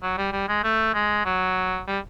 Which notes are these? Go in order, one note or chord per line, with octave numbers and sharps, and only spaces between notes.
F#3
G3
G3
G#3
A3
G#3
F#3
G3